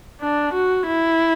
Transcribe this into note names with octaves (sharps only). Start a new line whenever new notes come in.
D4
F#4
E4